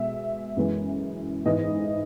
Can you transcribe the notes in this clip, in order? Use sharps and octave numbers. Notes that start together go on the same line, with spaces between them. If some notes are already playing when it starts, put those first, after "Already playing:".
Already playing: B2 G#3 E5
F#2 E3 G#3 B3
G#2 E3 B3 D#5